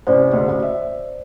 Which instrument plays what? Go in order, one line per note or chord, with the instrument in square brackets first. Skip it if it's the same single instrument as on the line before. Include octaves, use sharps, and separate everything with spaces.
[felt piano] A1 C3 C#4 [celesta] C5 D5
[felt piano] D2 C#3
A1 F#4
E5